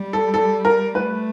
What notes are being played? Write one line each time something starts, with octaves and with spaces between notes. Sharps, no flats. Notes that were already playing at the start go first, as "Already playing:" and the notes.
Already playing: G3
A4
A4
A#4
A3 B4